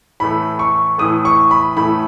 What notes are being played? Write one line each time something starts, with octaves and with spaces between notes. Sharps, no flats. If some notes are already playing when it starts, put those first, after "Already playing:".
A2 E3 A3 B5
C#6
A2 E3 A3 D#6
C#6
B5
A2 E3 A3 B5